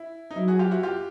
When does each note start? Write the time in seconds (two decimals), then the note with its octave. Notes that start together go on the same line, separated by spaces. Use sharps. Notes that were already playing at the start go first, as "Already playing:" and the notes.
Already playing: E4
0.31 D#4
0.36 F#3 E4
0.48 F#4 G#4
0.59 F4 G4
0.71 E4 F#4
0.83 F4 G4